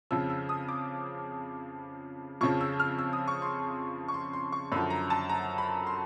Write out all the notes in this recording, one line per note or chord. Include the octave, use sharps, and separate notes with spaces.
F2 C#3 F3 E6
E6
D#6
D6
F2 C#3 F3 C#6
E6
F6
E6
D#6
C#6
C6
C#6
C6
C6
C#6
F#2 D3 F3 B5
A#5
A5
A#5
B5
C6